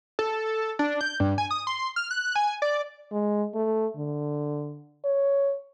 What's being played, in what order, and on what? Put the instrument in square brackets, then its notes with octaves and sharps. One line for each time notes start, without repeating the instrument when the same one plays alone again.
[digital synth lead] A4
D4
G6
G2
G#5
D#6
C6
F6
F#6
G#5
D5
[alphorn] G#3
A3
D3
C#5